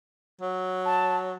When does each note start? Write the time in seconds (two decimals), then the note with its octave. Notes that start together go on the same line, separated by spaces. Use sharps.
0.42 F#3
0.85 A5